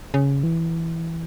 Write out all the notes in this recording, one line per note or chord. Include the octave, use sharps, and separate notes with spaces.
C#3
E3